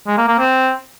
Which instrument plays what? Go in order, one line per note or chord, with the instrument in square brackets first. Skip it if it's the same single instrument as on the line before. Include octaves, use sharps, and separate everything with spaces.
[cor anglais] G#3
A#3
A#3
C4